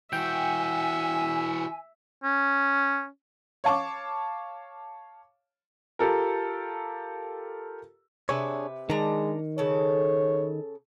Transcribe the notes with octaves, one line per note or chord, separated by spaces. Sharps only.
E3 F#4 E5 G5 G#5
C#4
C#5 F5 A5 C#6 D6
F4 G4 A4 A#4
C3 D4 G#4 B4 C#5 E5
D#3 G#3 D4 A#5
C#3 A4 C#5